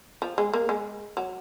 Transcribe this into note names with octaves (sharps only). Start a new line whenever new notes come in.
F3
G#3
A#3
G#3
F#3